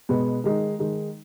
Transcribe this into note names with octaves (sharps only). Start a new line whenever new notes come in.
B2 G#3 B3
D#3 G#3 D#4
D#3 G#3 D#4